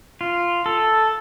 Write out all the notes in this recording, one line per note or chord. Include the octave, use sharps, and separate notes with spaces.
F4
A4